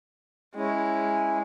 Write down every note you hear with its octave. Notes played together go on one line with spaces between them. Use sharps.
G#3 C#4 E4